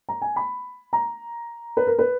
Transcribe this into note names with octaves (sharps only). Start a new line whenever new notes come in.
A#5
G#5
B5
A#5
B4
A#4
B4